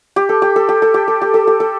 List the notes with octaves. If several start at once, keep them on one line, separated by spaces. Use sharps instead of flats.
G4
A4
G4
A4
G4
A4
G4
A4
G4
A4
G4
A4